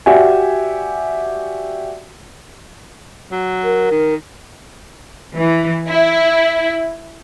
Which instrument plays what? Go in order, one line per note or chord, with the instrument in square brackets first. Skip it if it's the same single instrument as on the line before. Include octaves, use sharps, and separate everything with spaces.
[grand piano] F#4 G4 D5 E5 G#5
[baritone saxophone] F#3
[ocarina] A#4
[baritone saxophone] D#3
[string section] E3
E4